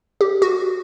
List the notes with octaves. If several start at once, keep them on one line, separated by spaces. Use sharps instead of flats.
G4
F#4